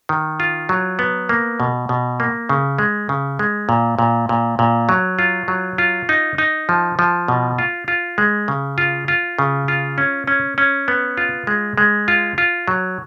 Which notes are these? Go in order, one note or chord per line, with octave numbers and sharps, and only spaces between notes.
D#3
F4
F#3
B3
A#3
B2
B2
A#3
C#3
G#3
C#3
G#3
A#2
A#2
A#2
A#2
F#3
F4
F#3
F4
D#4
D#4
F3
F3
B2
F4
F4
G#3
C#3
F4
F4
C#3
F4
C#4
C#4
C#4
B3
F4
G#3
G#3
F4
F4
F#3